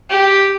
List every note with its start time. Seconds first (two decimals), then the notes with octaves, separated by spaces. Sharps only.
0.10 G4